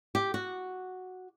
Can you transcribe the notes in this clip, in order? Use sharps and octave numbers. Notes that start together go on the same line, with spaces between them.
G4
F#4